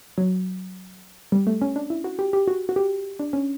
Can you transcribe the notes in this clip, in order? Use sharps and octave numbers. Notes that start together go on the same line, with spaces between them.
F#3
G3
A3
C#4
D4
E4
F#4
G4
G4
F#4
F#4
G4
D4
C#4